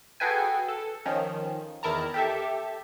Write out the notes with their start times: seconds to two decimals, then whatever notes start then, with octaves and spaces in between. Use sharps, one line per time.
0.20 F#4 G#4 A4 B4 G5 G#5
0.69 A4
1.06 D#3 F3 C#4
1.83 E2 D#3 E4 A#4 A5 A#5
2.14 G4 A4 E5